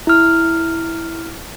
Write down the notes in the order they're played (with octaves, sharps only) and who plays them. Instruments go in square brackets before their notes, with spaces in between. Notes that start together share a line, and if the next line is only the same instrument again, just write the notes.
[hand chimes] E4 F6